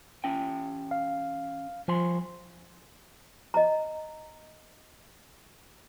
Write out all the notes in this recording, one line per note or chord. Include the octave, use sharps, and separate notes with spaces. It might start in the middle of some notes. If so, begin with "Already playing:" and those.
E3 C#4 G5
F5
C2 F3 G#5 C6
D#5 A#5